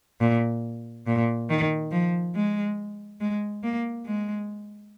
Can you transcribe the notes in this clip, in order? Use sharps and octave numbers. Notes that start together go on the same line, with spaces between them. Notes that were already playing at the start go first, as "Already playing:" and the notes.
A#2
A#2
D#3
F3
G#3
G#3
A#3
G#3